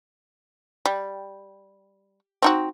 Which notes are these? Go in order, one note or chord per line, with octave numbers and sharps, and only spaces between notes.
G3
C4 D#4 F#4